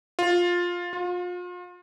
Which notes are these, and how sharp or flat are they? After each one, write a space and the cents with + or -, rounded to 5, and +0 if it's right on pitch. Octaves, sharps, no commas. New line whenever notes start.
F4 +10
F4 +35